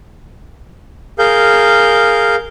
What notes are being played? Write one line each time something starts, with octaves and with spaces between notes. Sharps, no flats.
G#4 A#4 F5 G6